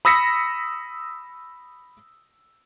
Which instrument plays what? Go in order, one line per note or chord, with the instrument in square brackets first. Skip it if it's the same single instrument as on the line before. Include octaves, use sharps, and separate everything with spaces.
[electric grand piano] B5 D#6 E6 A#6 B6 C#7